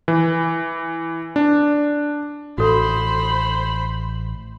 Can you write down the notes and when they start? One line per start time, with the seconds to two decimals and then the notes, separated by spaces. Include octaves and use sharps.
0.08 E3
1.36 D4
2.58 A1 F#4 A4 C5 B5